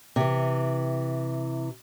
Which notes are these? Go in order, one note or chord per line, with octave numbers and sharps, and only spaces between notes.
C3 E3